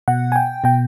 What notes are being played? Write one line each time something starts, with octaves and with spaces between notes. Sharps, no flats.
B2 F#5
G#5
G5
B2 G5